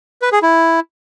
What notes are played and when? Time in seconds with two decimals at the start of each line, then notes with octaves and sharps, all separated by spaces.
0.22 B4
0.32 G#4
0.43 E4